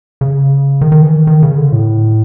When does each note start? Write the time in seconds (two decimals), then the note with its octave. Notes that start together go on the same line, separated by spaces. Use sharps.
0.21 C#3
0.81 D#3
0.92 D#3
1.02 E3
1.12 D#3
1.27 D#3
1.43 C#3
1.57 D3
1.72 A2